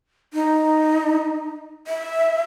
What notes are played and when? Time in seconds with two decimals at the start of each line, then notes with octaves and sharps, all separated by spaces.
0.34 D#4
1.87 E5